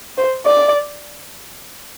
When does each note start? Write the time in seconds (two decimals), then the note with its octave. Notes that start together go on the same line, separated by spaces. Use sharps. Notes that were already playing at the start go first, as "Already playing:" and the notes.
0.17 C5
0.46 D5